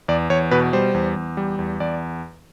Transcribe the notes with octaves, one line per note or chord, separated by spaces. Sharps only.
E2 D5
E2 C#5
B2 B4
G3 C5
E2
E2
G3
E2
E2 D5